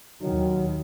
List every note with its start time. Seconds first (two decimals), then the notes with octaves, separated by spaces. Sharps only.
0.22 D#2 D#3 F#3